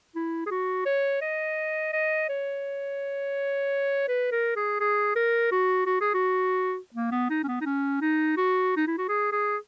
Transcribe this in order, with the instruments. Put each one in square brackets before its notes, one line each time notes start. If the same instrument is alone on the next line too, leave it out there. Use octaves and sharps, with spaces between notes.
[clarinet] E4
G#4
F#4
C#5
D#5
D#5
C#5
B4
A#4
G#4
G#4
A#4
F#4
F#4
G#4
F#4
A#3
B3
D#4
C#4
B3
D#4
C#4
D#4
F#4
D#4
E4
F#4
G#4
G#4